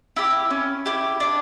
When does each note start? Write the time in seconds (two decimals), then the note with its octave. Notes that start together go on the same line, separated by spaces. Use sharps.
0.16 E4 G4
0.50 C#4
0.86 E4 G4
1.20 D4